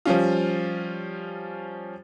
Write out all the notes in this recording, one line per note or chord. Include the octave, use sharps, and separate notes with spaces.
F3 G3 C#4 F4